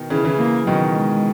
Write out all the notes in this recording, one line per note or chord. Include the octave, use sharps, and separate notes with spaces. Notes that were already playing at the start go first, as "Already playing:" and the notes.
Already playing: B2 D#3
C#3 E3
C#3 E3
A#3
B2 D#3 F#3
G#3